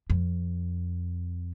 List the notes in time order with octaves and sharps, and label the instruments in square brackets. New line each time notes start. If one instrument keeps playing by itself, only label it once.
[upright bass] F2